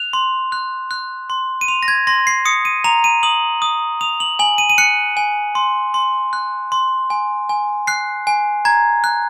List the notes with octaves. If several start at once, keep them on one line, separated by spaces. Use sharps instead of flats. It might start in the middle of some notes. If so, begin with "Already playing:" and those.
Already playing: F#6 F7
C6
F#6
F#6
C6
D#7
C6 F7
A#6
G#6
C6 A#6
C7
D#6 C#7
D#7
A#5 F7
D#7
D#6 F#7
D#6
D#6 F7
F#7
G#5 F#7
D#7
D#7
F#6 C#7
G#5
C6
C6
F#6
C6
G#5
G#5
F#6 C7
G#5
A#5 G#6
F#6